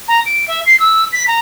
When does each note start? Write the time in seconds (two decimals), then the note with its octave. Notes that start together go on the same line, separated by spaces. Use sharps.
0.08 A#5
0.26 D7
0.48 E5
0.66 C7
0.80 E6
1.12 B6
1.28 A#5